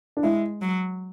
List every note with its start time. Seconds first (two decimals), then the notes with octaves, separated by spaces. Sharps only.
0.17 D4
0.23 G#3 E4
0.62 F#3